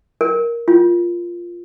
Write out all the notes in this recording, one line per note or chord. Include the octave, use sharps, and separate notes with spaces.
A#4
F4